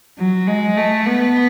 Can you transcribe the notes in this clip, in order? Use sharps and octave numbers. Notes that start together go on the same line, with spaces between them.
F#3
G#3
A3
B3